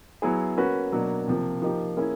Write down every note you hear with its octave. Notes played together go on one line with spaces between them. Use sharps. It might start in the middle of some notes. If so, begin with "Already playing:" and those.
F#3 B3 E4 G#4
A#3 C#4 F#4 B4
B2 F#3 A#3 D4
C3 F3 A#3
F3 A#3 D#4 G4
A#3 C#4 E4 G#4